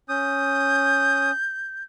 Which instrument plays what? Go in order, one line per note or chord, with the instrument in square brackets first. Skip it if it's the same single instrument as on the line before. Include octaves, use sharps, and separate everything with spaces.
[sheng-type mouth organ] C#4 D#6 [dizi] G6